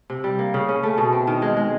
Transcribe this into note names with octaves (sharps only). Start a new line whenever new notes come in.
C3
G3
A#3
C#3
C#4
A3
B2
C4
D#3
G#3
G#3